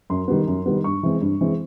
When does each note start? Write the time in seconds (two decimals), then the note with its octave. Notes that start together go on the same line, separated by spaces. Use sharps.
0.10 F#2 C6
0.28 D#3 G3 B3
0.47 F#2
0.66 D#3 G3 B3
0.84 G2 C#6
1.03 E3 G#3 C4
1.21 G2
1.41 E3 G#3 C4